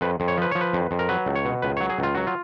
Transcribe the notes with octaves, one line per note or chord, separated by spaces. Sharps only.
F2 B4
F2
C#5
F3 B4
F3 C#5
B4
F2
F2
A#4
F#3 B4
C#2
C#5
B2
C#2 B4
F#3 C#5
G#4
C#2 F4
F#3 F#4
F4